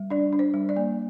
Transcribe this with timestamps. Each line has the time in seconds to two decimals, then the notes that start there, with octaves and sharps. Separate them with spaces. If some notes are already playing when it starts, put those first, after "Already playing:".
Already playing: G3
0.10 D4 D5
0.33 D4
0.39 C5
0.54 G3
0.69 D5
0.76 A#3